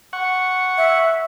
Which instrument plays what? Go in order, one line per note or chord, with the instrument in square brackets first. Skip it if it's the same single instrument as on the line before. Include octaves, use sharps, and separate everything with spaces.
[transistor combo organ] F#5 C#6
[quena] E5